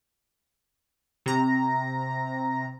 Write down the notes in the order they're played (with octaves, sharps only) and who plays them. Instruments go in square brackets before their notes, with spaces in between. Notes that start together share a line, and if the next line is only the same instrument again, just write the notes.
[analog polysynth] C3 A#5